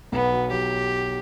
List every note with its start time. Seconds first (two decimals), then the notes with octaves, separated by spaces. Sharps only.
0.12 B1 B3
0.32 F#3
0.51 F#3 G4